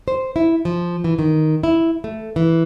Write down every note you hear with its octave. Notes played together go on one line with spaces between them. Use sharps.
C5
E4
F3
E3
D#3
E4
A3
E3